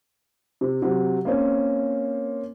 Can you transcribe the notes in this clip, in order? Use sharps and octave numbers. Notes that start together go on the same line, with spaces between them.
C3
C3 F#3
A#3 C4 C#4